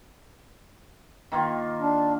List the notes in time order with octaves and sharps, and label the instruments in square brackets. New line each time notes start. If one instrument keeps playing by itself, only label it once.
[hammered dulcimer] D#3 A#3 F4
[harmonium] D4